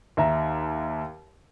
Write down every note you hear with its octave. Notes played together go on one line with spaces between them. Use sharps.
D#2 E5 A#5